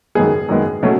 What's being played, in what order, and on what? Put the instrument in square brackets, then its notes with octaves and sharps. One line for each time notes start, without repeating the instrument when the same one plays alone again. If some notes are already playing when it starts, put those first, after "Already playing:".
[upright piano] F#2 D#3 G#3 B3 G#4
F#2 D#3 G#3 B3
B2 F#3 A3 C#4